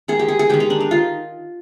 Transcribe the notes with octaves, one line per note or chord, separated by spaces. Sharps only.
D#3 G#3 G#4
G4
G#4
G#4
D#3 G#3 G4
D#4
D4
D#4
D#3 F4